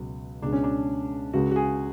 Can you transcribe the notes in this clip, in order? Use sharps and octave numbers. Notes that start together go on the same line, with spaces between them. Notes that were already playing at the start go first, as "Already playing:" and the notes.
Already playing: C#2 B2 F#3
C#2 B2 G#3 D4
C#4
D4
C#2 C#3 G#3 F#4
F#4
G#4